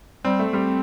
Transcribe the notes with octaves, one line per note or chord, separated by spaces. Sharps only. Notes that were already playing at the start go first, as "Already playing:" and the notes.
G3 C4
A3
G3 C4